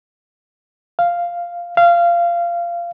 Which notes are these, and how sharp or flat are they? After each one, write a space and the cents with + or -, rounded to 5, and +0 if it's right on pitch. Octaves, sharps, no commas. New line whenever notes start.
F5 -5
F5 -20